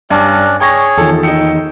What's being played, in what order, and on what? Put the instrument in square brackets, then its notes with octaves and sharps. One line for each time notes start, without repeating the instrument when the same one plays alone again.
[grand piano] G2 [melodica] C#4 D4 D5
[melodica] G#4 C#5 [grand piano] G5 C#6 A#6
[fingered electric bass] E2 D#3 [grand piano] F3 A4
[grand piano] D#4 C#7 [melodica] G5 E6